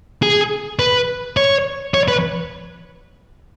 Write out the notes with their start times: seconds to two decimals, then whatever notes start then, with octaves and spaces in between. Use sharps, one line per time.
0.23 G#4
0.79 B4
1.37 C#5
1.94 C#5
2.08 B4